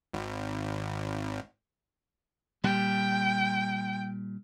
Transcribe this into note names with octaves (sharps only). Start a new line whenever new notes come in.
G#1
A#2 G3 G5